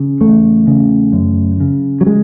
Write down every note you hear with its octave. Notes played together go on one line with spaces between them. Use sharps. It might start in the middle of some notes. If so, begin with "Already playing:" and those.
Already playing: C#3
E2 A3
C#3
F#2
C#3
F#3
G#3